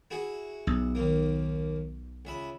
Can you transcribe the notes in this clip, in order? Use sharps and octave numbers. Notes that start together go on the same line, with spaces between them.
E4 F#4 G#4
B1
D#2 A#3
C#2 E5 B5